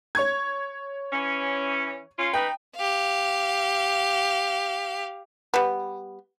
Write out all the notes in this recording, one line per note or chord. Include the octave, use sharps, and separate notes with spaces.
C#5 C#6 G#6
E3 C#4
C#4 F4
D#4 B4 G5
G4 F5
G3 B3